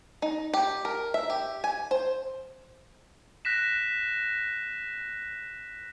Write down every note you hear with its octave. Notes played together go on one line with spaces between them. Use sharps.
D#4
G4
A#4
E5
G4
G#5
C5
F#6 A#6 B6 E7